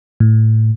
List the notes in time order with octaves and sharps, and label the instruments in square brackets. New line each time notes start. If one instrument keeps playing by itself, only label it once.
[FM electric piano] A2